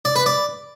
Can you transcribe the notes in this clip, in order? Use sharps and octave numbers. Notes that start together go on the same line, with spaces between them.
D5
B4
D5